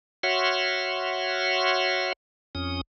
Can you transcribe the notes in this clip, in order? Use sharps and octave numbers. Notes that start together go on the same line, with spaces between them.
F#4 C#5 E5 F#5 C6 F6
F2 C#4 D#6